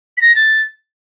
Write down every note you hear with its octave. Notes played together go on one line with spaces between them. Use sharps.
B6
A#6
A6